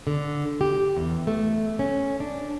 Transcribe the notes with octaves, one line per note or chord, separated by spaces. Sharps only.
D3
G4
E2
A3
C#4
D4